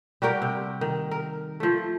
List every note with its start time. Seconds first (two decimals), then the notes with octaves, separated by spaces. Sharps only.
0.22 G3 F#4 A#4 G5
0.42 C3
0.81 D#3
1.11 A#4
1.60 F3 A3